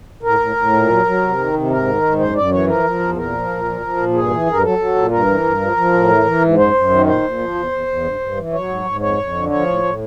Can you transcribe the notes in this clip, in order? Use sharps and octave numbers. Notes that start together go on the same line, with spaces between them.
A2 A#4
A2
A2
A#2
F#3
F#3
C3
D#3
C3
G#2 A#4
D#3
G#2
F#2 C5
F#2 D5
E3 C#5
F3 A#4
F3
E2
A#2 A#4
F3
A#2
F3
F3
A#2
G2 G#4
E3
G2 A#4
F#3 A4
F#3
A#2
G2 A#4
E3
G2
F3
F3
A2
E3
E3
G#2
F#2 C5
F#2
D#3
A#2 C5
A#2
F3
E2
E2
E2
G2
G2
E3
F#3 C#5
G#2
G#2
F2 C#5
F2
D3
F3 C#5
A2
A2